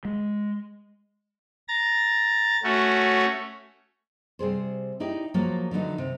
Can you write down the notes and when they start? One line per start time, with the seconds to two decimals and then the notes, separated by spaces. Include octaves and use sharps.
0.05 G#3
1.68 A#5 A6
2.63 A3 C#4 F#4
4.39 C3 G3 G#4 C5
5.00 D#4 E4 G4 D5
5.34 F3 F#3 A#3 F4 A#4
5.71 D3 E3 F#3 D#4
5.98 C3